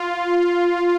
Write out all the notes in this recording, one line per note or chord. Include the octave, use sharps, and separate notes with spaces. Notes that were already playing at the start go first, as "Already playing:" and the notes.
Already playing: F4